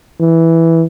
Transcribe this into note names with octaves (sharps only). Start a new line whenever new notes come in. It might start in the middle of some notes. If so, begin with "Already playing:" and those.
E3